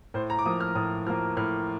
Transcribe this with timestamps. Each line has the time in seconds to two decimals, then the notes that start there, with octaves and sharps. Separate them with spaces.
0.14 A2 C5
0.30 A#5
0.39 D6
0.45 F3 A#3 D#6
0.60 F6
0.75 A2 D#6
1.07 F3 A#3 F6
1.37 A2 F6